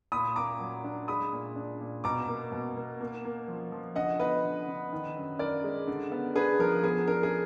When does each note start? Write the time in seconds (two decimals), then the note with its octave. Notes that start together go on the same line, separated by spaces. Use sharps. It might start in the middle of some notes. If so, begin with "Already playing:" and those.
0.12 A#2 B5 D#6
0.36 A#2 A#5 D6
0.60 F#3
0.84 D4
1.08 G#3 B5 D#6
1.33 A#2
1.56 D4
1.81 A#2
2.04 B2 A#5 D6
2.28 A#3
2.52 B2
2.77 A#3
3.01 A#3
3.25 A#3
3.48 F3
3.72 F3
3.96 D3 D#5 F#5
4.19 B3 B4 D#5
4.45 D3
4.68 D3
4.92 D#3
5.16 F#2
5.39 F#2 A#4 D5
5.64 G#3
5.87 D3
6.12 B3
6.35 D4 G#4 B4
6.59 F3 A#4
6.83 B3 G#4
7.08 D4 A#4
7.23 G#4